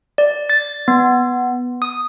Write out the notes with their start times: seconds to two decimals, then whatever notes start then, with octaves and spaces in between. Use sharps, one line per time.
0.18 D5
0.50 A6
0.88 B3
1.82 D#6